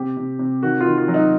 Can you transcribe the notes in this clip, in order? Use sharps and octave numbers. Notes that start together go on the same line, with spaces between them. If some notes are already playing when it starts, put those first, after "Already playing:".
Already playing: C3 G4
C3
C3
D#3 F#4
F4
D#3
F4
F#3
D#4